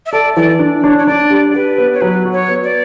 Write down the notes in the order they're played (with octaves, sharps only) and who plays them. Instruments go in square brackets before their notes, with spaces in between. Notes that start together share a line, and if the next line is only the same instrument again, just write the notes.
[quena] E5
[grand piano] A4 [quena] D5
[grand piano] E3 [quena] D5
[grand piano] D4
[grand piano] D4 [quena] C#5
[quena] C#5
[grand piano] D4 [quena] D5
[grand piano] G4
[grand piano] G4 [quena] B4
[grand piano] B3
[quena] C#5
[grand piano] F#3 [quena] B4
[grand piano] F#4
[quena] C#5
[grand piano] B3
[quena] D5